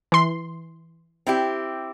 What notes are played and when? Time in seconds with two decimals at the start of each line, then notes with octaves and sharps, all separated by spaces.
0.12 E3 C6
1.27 C4 E4 G4